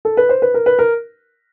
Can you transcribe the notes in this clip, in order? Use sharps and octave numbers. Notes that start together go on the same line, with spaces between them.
A4
B4
C5
B4
A#4
B4
A#4